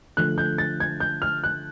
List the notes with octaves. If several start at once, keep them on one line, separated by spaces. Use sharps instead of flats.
D3 F3 A3 F#6
G6
A6
G#6
G6
F6
F#6